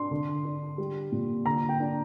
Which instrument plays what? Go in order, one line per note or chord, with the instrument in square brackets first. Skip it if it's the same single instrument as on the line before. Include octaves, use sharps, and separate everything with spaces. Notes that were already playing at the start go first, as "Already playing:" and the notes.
Already playing: [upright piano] D4 C6
D3
D4
G3
A#2
D3 A#5
G5
D4